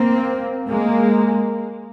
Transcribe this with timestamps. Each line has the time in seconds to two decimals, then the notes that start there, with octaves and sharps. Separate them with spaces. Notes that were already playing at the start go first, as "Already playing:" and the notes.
Already playing: A#3 C4
0.67 G#3 A#3